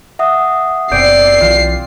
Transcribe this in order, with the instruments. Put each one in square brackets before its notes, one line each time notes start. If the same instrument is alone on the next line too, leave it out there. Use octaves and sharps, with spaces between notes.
[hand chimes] E5 F#5 D#6
[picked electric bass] F#1 B2 [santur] C4 D5 [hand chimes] G6 D7 [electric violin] C7
[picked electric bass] B1 E3 [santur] F4